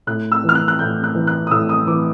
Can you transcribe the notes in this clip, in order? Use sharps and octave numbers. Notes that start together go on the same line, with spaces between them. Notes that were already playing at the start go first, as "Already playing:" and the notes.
A2 F#6
E6
E3
F6
F#6
F#6
A2 G6
F#6
E3
F#6
D#6
A2 E6
D#6
E3 D6